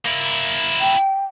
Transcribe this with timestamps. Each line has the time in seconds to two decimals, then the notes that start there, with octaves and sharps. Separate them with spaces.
0.06 A#3 E4
0.81 G5